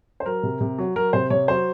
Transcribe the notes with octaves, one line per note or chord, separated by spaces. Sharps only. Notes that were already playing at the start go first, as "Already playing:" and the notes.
C5
F#3 A#4
C3
C3
F#3
F#3 A#4
C3 C5
C3 C#5
F#3 C5